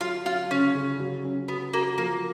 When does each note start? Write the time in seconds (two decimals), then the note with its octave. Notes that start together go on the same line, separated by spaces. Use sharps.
0.01 F#3 F4
0.25 F#3 F4
0.51 C#3 C#4
0.75 C#3
0.99 F#3
1.25 C#4
1.48 B3 F#4
1.73 A#3 F#4
1.98 F3 A#3